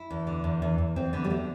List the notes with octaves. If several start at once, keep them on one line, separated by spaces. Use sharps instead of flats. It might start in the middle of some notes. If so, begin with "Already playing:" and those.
Already playing: E4
E2
D3
E2
E2
E2
E2 C4
D3 B3
G3
D3 A3